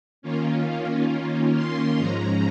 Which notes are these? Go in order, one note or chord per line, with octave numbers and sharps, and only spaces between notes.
D#3 A#3 C#4 F4
C6
G#2 F3 G#3 C#4 A#5